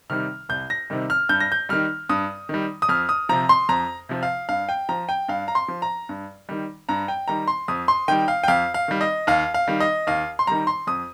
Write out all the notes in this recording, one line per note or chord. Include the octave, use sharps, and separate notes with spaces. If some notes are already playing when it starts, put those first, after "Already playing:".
C3 D#3 G3 F6
C2 G6
A#6
C3 D#3 G3
F6
G2 G6
A#6
G6
D#3 G3 F6
G2 D#6
D#3 G3
D#6
F2 F6
D#6
C3 F3 A#5
C6
F2 A#5
C3 F3
F5
G2 F5
G5
F3 A#5
G5
G2 F5
A#5
C6
F3
A#5
G2
D#3 G3
G2 A#5
G5
D#3 G3 A#5
C6
F2 D#6
C6
D#3 G3 G5
F5
G5
F2 F5
F5
D#3 G3
D#5
D#2 F5
F5
D#3 G3
D#5
D#2 F5
C6
D#3 G3 A#5
C6
F2 D#6